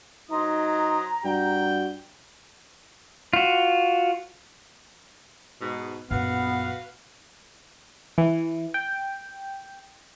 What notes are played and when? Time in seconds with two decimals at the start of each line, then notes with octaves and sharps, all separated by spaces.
0.30 F#3 D#4 C5 A#5 D#6
1.25 G2 F#4 G5
3.33 F4 F#4
5.61 G#2 B2
6.11 A#1 F#2 B3 F#4 B4 F5
8.18 E3
8.74 G5